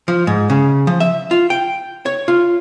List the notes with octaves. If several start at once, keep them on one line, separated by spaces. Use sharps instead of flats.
F3
G#2
C#3
F3
E5
F4
G5
C#5
F4